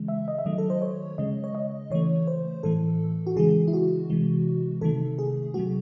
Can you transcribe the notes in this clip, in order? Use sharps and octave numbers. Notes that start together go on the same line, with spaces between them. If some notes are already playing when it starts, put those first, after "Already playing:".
Already playing: C#3 E3 G#3
E5
D#5
E5
D#3 F#3 A3 D#5
A4
C5
C#5
C#3 G#3 D#5
C#5
D#5
C#3 E3 A3 C#5
C5
A2 E3 A3 A4
F#4
C#3 E3 G#3 G#4
E4
F#4
C3 E3 G#3
C3 D#3 A3 A4
G#4
C3 F#3 A3 F#4